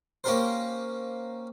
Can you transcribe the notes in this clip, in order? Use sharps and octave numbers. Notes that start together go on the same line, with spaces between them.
A#3 C#4 G4 A#4 C5